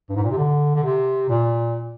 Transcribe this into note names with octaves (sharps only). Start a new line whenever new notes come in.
G2
G#2
A#2
C3
D3
D3
C3
A#2